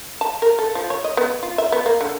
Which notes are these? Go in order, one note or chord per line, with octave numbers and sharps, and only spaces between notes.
A5
A#4
A4
F3
C#5
D#5
B3
F4
E5
B3
A#3
D3